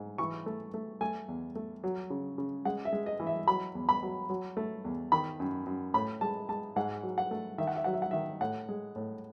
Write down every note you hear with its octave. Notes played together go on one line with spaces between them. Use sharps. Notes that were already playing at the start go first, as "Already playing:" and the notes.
Already playing: G#2
E3 C#6
A3
A3
A3 G#5
E2
A3
F#3
C#3
C#3
G#3 F#5
E5
G#3
D#5
E3
E5
F#3 B5
E2
B5
F#3
F#3
A3
E2
D#3 B5
F#2
F#2
A2 B5
G#3 A5
G#3 A5
G#2 F#5
F#3
F#5
A3
D#3 E5
F#5
E5
F#3 F#5
E5
F#5
D#3 E5
A2 F#5
G#3
A2